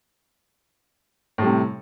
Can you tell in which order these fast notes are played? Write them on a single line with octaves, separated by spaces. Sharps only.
A2 G3 C3